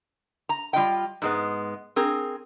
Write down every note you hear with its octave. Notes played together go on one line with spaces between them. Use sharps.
A#5
G3 F4 D#5 G5
G#2 G#3 B3
C4 G#4 A#4